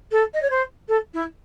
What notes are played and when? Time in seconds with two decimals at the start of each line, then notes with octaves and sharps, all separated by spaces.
0.11 A4
0.33 D#5
0.42 C#5
0.50 C5
0.88 A4
1.13 E4